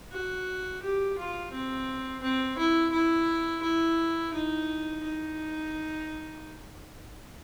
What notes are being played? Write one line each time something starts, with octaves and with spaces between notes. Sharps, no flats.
F#4
G4
F4
C4
C4
E4
E4
E4
D#4
D#4